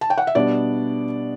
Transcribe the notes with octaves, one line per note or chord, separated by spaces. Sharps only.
A5
G5
F#5
E5
B2 G3 B3 D4 D5